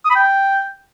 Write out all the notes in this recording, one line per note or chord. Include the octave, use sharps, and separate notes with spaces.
D#6
B5
G5